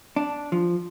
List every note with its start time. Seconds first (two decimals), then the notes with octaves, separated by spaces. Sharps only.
0.16 D4
0.52 F3